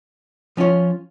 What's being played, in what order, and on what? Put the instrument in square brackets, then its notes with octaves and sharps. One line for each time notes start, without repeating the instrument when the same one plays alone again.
[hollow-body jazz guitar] F3 C#4 F4 C#5